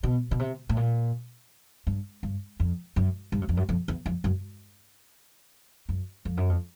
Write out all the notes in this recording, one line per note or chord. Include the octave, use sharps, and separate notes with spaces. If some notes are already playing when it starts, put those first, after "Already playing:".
B2
B2
C3
A2
A#2
G2
G2
F2
F#2
G2
F#2
F2
F#2
F2
E2
F2
F#2
F#2
F2
F#2
F2